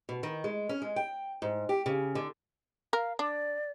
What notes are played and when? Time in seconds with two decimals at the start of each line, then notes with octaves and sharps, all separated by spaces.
0.09 B2
0.23 D#3
0.44 G#3
0.69 C#4
0.82 G#3
0.96 G5
1.42 G#2
1.69 G4
1.86 C#3
2.15 D3
2.93 A#4 F5
3.19 D4 D5